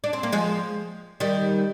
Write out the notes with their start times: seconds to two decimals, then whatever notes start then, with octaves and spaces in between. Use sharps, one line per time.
0.04 D4
0.13 C4
0.23 A#3
0.33 F3 G#3
1.20 D#3 G3